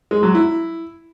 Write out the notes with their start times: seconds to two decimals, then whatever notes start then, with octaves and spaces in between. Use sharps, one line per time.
0.11 G#3
0.23 F#3
0.35 E4